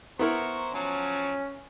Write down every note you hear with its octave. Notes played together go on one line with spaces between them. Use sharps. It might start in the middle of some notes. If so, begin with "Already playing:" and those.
B3 E4 A#4 C5 A#5 C#6
F3 F#3 C#4